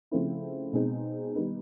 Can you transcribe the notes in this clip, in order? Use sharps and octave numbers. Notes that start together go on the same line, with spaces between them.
C#3 F3 A3 C4 E4
B2 G#3 C4 D#4
D#3 G3 B3 D#4